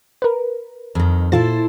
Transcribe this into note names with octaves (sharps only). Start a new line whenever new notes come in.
A#4 B4
F2 D#3
A#2 E4 F4 A4 C5 A6